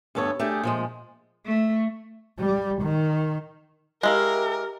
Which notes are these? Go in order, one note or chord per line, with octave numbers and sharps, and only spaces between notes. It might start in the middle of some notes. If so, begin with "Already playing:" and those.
D2 G2 B3 A4 C#5
A3 D4 G4 G#4
A#2 F3 G#3
A3
G3
D#3
G#3 E4 G4 A#4 F5